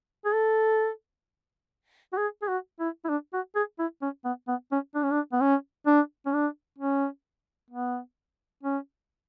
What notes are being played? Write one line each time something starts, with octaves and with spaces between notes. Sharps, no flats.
G#4
A4
F#4
G#4
G#4
F#4
E4
E4
D4
F#4
G#4
E4
C#4
B3
B3
C#4
D4
C#4
D4
B3
C#4
D4
C#4
D4
C#4
B3
C#4